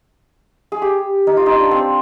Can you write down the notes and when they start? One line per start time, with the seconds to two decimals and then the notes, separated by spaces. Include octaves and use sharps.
0.72 G#4
0.82 G4
1.27 D#4
1.37 F4
1.46 D#4
1.60 D4
1.71 C4